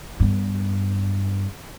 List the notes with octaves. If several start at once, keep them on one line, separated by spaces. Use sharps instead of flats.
G2 B3